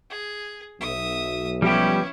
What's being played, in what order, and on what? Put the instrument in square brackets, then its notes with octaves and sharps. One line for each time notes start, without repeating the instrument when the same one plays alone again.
[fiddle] G#4
[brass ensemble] B1 [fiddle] E5 D#6
[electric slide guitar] F3 B3 [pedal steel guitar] G3 G4 [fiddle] C#4 E4